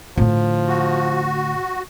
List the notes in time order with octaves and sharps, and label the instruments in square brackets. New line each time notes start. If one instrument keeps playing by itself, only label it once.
[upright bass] A2 D3 [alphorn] F3
[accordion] F#4